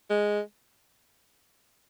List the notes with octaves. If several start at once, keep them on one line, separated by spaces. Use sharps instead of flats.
G#3